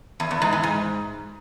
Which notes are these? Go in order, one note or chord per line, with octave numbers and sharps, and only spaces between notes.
E2
E2
G#2
E3
G#2